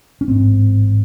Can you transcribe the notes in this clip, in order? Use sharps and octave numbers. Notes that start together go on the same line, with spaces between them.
C#4
A1 G#2 C4